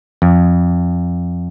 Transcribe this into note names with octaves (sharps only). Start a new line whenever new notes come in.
F2